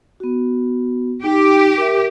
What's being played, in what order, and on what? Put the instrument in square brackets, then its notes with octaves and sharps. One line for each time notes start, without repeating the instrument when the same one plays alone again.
[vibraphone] B3 F#4
[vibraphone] D#4 [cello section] G4
[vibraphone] A#4 E5